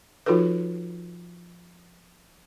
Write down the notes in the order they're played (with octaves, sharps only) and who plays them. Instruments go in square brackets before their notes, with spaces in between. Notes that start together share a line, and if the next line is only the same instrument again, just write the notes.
[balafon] F3 D#4 F4 F#4 A4 B4